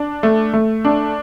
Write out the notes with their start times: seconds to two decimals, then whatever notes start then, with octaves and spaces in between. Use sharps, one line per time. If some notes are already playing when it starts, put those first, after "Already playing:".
Already playing: D4
0.23 A3
0.53 A3
0.85 D4